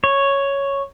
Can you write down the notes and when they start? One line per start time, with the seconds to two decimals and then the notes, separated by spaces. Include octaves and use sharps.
0.04 C#5